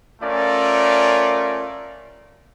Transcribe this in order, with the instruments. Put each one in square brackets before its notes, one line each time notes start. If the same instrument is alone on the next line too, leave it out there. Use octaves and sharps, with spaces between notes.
[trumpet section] A3 C#4 F4 A#4 D5